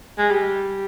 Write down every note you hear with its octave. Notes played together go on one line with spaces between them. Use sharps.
G#3
G3